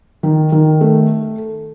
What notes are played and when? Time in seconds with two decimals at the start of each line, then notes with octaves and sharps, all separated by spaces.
0.23 D#3
0.52 D#3
0.81 A3